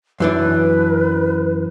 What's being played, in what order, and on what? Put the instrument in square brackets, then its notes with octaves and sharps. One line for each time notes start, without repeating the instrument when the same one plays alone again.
[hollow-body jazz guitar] F#2 E3 D4 [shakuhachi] B4